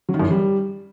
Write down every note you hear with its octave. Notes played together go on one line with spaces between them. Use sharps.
F#3
D#3
F#2
E3
G3